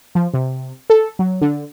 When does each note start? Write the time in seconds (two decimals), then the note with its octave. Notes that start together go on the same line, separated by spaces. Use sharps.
0.15 F3
0.34 C3
0.90 A4
1.19 F#3
1.41 D3